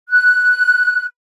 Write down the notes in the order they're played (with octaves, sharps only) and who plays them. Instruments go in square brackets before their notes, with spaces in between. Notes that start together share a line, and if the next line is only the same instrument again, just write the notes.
[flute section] F#6